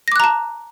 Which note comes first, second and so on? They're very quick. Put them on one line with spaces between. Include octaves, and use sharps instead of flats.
A#6 D6 F#6 A#5 A5